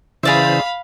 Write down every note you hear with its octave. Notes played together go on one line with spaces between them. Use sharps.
C#3 E3 G#4 C5 D5 E5 F5 B5